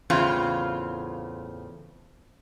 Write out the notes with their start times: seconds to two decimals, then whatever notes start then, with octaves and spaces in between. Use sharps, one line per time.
0.10 E2 A2 C#3 C4 F4